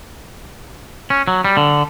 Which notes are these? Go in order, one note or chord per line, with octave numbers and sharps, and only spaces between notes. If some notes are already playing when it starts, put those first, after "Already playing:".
C#4
F#3
G3
D3